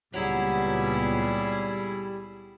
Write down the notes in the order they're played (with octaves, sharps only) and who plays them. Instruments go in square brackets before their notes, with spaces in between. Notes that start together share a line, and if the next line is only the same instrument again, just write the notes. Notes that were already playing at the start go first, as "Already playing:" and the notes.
[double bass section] C#2 A#2 B3 [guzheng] F#3 [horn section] G3 [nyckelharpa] E4 G#4